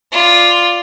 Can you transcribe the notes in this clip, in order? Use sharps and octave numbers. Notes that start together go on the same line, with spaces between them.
F4 D5